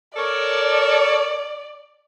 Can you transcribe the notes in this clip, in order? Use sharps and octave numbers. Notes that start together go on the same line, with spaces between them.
A4 A#4 C#5 D5